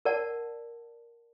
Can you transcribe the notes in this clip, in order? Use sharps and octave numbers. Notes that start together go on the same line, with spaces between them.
A#4 D5 F#5 A5